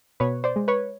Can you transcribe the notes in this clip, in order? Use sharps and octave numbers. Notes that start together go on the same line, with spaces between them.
B2 B4 C#5
C5 D5
G#3
B4 C#5